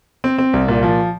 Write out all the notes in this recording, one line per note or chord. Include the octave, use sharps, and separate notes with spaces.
C4
C4
C2
A#2
F3